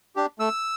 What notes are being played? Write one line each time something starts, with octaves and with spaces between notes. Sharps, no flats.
D4 G4
A3 E6